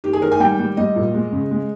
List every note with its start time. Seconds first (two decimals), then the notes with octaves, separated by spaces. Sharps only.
0.04 D#3 G4
0.13 G#4
0.22 D#3 A#4
0.32 G#5
0.40 G3 G5
0.59 G3
0.77 G3 D#5
0.96 A#2
1.14 G#3
1.33 C#3
1.51 G#3